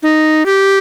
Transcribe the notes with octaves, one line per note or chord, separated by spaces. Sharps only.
D#4
G4